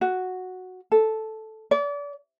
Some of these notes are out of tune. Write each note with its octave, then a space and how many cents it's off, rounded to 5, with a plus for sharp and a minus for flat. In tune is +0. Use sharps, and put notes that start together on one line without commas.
F#4 -5
A4 -5
D5 -35